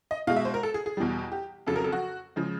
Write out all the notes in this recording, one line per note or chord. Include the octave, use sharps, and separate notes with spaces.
D#5
B2 G#3 F5
E5
C5
A#4
A4
G#4
G#4
E2 B2 G3
G4
F2 C#3 F#3 A4
A#4
A4
F#4
C#3 F3 G#3